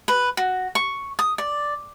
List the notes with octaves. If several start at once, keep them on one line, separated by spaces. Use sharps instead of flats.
B4
F#4
C#6
D#6
D5